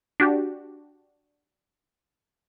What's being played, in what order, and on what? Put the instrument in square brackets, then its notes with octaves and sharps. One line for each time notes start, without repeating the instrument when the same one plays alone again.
[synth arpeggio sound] D4 F#4 G4